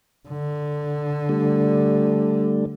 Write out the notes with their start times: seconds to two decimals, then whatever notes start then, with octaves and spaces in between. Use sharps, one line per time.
0.29 D3
1.29 G3 A3 D4